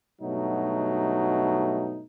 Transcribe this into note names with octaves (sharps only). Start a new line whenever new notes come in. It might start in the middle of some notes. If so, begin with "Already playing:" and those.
G2 B2 F#3 A3 D#4